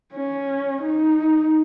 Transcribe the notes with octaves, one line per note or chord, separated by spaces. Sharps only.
C#4
D#4